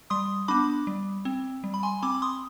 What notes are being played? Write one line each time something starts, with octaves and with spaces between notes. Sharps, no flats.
G3 C6 D#6
B3 D4 B5 D6
G3
C4
G3
B5
G#5 C6
C4 B5 D6
D6
C6 D#6